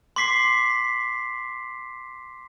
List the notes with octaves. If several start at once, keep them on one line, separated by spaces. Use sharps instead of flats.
C6 D6 B6 C7